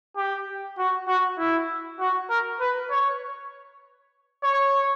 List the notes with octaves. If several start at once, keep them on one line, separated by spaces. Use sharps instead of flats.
G4
F#4
F#4
E4
F#4
A#4
B4
C#5
C#5